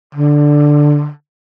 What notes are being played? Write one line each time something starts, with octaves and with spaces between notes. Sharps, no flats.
D3